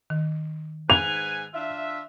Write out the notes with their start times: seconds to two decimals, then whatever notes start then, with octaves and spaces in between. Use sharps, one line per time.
0.10 D#3
0.90 G#2 B4 G#5 F7
1.54 D4 F4 E5